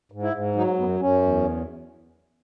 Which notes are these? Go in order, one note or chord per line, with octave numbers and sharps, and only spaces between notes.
G#2
E4
G#2
F#3 D#4
F#2 B3
F#2 C#4
E2